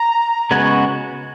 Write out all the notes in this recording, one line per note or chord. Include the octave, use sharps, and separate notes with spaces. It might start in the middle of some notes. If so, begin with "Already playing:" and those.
Already playing: A#5
C#3 G#3 B3 F#4 C#5 G#5